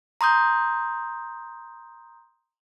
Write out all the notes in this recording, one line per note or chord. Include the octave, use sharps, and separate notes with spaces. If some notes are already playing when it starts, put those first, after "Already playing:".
A#5 C6 D#6 G6